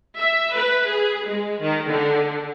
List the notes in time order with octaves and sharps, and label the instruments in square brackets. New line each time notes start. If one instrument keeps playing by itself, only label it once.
[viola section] E5
B4
G#4
G#3
D#3
D3